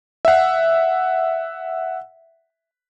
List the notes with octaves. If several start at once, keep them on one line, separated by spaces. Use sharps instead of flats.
E5 F#5